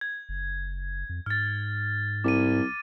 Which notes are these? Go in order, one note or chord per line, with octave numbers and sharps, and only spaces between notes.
G#6
F#1
F2
G#2 F6 A6
C2 D6 D#7